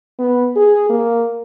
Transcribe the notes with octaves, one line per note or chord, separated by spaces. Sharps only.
B3
G#4
A#3